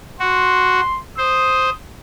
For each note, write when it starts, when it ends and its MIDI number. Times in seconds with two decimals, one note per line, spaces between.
0.20 0.81 66
0.20 0.99 84
1.18 1.70 72
1.18 1.73 87